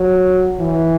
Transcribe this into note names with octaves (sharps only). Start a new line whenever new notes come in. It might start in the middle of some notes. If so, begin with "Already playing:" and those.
Already playing: F#3
E3